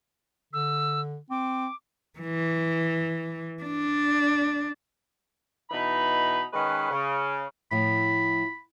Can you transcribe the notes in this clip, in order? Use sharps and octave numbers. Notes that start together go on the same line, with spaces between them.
D3 E6
C4 D6
E3
D4
B2 E3 D#4 B5
D#3 G#3 C#4 B4
C#3
A2 F3 B5